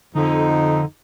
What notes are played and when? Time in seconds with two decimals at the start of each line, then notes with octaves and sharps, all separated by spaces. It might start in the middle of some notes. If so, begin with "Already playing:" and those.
0.15 F2 D3 D#4